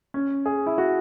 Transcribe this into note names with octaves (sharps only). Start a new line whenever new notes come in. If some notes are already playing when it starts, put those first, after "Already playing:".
C#4
G#4
E4
F#4